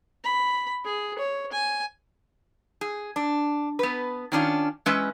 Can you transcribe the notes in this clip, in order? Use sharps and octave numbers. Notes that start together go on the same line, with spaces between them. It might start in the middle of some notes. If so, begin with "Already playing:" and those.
B5
G#4
C#5
G#5
G#4
D4
B3 B4
D#3 C#4 D4 F4
E3 G#3 C#4 B4 D#5 E5